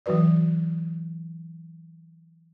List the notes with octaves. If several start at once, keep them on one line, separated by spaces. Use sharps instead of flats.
E3 F#3 F#4 B4 D5